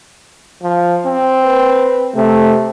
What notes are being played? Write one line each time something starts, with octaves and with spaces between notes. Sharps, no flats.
F3
C4
B4
C3 A3